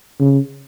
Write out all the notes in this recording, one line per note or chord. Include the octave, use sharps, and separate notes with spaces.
C#3